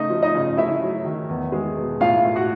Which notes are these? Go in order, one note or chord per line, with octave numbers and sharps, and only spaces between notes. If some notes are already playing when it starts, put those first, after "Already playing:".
Already playing: C#3 A3 D#4 D#5
F3
D#4 D#5
C#3
A3 E4 E5
F#3
D#3
E2
G#3
B2
A2 F4 F5
A3
F#4 F#5